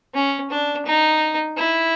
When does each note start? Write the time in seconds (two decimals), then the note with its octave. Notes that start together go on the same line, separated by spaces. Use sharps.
0.14 C#4
0.50 D4
0.86 D#4
1.58 E4